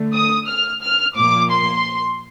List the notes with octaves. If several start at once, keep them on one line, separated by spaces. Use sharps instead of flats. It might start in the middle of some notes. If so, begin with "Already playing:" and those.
Already playing: D3 A3
D#6
F6
F6
A#2 F3 A#3 D6
C6